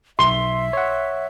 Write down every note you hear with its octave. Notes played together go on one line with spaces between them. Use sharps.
B1 E5 C6 G7
C#5 F#5